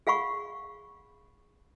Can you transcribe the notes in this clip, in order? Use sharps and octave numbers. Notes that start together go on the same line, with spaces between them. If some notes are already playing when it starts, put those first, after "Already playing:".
G#4 F5 F#5 B5 C#6